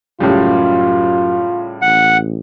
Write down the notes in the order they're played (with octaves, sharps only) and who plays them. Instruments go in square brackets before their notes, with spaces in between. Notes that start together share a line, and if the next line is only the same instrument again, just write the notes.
[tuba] F#2 [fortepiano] A2 C#3 G3 [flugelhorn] F4
[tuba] A1 [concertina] F#5